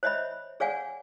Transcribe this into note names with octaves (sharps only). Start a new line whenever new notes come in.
C5 C#5 D#5 E5 B5
G#4 C#5 D5 F5 F#5 G#5